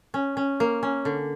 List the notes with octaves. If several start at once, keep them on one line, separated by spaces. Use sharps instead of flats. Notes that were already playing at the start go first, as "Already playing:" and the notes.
C#4
C#4
A#3
C#4
D3